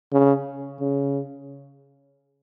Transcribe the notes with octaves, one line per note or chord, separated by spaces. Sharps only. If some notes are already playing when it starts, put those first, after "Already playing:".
C#3
C#3